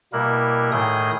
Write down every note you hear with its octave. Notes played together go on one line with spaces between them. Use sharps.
B2 G3 A#3 E4 A#4 F#6
A2 D#3 A3 G#4 D#6 G6